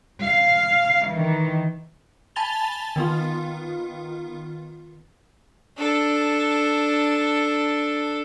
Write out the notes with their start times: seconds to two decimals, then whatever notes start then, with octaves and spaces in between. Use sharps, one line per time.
0.23 F5
1.08 D#3 E3
2.36 G#5 A5 B5 A6 F7 G7
2.96 D#3 B3 F4
5.78 D4 A4